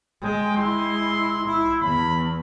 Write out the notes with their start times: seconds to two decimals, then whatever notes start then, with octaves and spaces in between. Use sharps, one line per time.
0.23 G#3 G5
0.56 G#3 E4 C6
1.46 E4
1.81 E2 B5